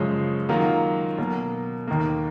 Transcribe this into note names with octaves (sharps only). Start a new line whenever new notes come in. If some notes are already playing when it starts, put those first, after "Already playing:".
Already playing: F#2 C#3 F3 G#3 C#4
D#3 F#3 A#3 F4
B2 F#3 A#3
D#2 D#3 A#3